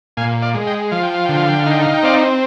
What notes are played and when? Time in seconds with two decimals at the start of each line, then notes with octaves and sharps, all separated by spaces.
0.17 A#2 F5 G#5
0.42 D5 F5
0.54 G#3
0.67 D#5 G5
0.91 F3 F5
1.03 G5
1.14 F5
1.26 D3 G5
1.37 F5
1.48 G5
1.59 F5
1.66 D#4 G5
1.82 F5
1.94 G5
2.03 C4 D5 F5